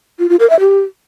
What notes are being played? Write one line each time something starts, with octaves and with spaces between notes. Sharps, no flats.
F4
F4
A#4
E5
G4